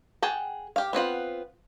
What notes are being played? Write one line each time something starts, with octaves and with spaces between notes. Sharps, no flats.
G#4 F#5 G5 A5
G4 F5
B3 C4 F4 F#5